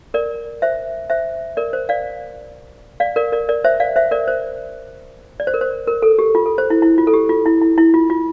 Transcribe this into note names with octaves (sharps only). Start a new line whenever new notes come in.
A#4 D5
C5 E5
C5 E5
A#4 D5
C5
D5 F5
D5 F5
A#4 D5
A#4 D5
A#4 D5
C5 E5
D5 F5
C5 E5
A#4 D5
C5
D5
C5
A#4
C5
A#4
A4
G4
F4
A4
C5
E4
E4
F4
A4
G4
F4
E4
E4
E4
F4
F4